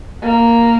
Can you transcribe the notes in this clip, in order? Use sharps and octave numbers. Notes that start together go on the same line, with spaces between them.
A#3